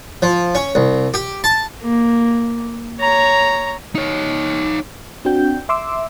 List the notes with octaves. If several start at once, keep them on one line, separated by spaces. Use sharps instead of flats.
F3
C#4
C2
G4
A5
A#3
C#5 A#5
D#4 C#5
C4 D4 F#4 G5 G6
E5 C6 D6 E6